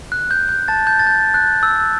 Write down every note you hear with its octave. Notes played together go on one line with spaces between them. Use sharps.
F#6
G6
G6
A5 A6
G6
A6
G6
F#6
E6